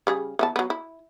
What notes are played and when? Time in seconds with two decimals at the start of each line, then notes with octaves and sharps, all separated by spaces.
0.07 C#3 G3 G#4
0.39 E3 B3 A5
0.56 F#3 B3
0.70 E4